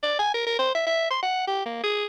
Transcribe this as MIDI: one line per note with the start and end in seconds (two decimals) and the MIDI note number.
0.03 0.16 74
0.19 0.34 80
0.34 0.45 70
0.47 0.55 70
0.59 0.72 72
0.75 0.83 76
0.87 1.08 76
1.11 1.18 84
1.23 1.45 78
1.47 1.63 67
1.66 1.79 58
1.84 2.06 68